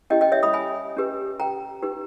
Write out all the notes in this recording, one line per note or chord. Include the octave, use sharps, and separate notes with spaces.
C#4 E4 G4 D#5 G5
D#5 G5
C#5 E5
B5 D#6
G#5 B5
C#4 G4 B4
G5 A#5
D#4 G4 B4